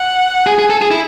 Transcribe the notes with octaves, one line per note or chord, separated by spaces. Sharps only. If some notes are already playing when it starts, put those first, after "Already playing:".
Already playing: F#5
G#4 G#5
G#4
A4
G#4
E4